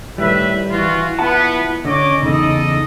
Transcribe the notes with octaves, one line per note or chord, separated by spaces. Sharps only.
A2 D#3 G3 B4 E5
E3 F4 F#4
B3 E4 F4 F#5 A5
D3 C#4 C#5 D#5 D6
E2 C#3 D#4 A4 D5 D#5